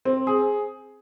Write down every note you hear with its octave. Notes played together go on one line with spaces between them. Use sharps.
C4
G#4